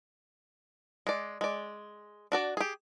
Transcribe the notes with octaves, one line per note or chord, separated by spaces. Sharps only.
G#3 D5
G#3 D5
D4 F#4 D5
G4 G#4